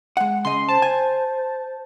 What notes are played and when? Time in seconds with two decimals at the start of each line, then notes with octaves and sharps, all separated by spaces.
0.17 G#3 F#5
0.45 C#3 D#5 C6
0.69 C5 A5
0.82 G#5